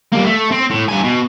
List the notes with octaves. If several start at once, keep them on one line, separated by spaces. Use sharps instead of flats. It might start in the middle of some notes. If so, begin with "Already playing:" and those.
G3 A#3
A3
C4
A2
G2 G#5
B2